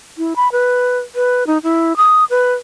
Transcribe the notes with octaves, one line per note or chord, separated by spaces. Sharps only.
E4
B5
B4
B4
D#4
E4
D#6
B4